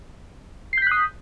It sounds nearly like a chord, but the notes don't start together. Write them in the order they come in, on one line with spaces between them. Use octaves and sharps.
C7 G6 B6 F#6 D#6